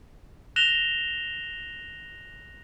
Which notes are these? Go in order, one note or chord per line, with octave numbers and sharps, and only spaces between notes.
F#6 A#6 E7 F7 G7